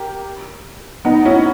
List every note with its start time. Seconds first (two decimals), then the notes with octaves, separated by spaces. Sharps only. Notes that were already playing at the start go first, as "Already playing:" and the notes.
Already playing: G4 A#4
1.05 B3 D#4
1.25 C#4 E4